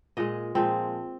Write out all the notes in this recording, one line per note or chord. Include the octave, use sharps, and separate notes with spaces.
A#2 G#3 D#5
A#2 F3 G#3 C4